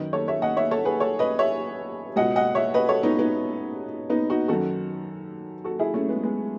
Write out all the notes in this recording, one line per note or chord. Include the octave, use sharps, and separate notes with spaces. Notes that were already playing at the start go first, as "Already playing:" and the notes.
Already playing: F#2 D#3 B4 D#5
A4 C#5
C#5 E5
D#5 F#5
C#5 E5
A4 C#5
G#4 B4
A4 C#5
B4 D#5
C#5 E5
C#2 B2 D#5 F#5
D#5 F#5
C#5 E5
B4 D#5
A4 C#5
B3 D#4
B3 D#4
B3 D#4
D#4 F#4
F#2 D#3 F#4 A4
F#4 A4
E4 G#4
A3 C#4
G#3 B3
G#3 B3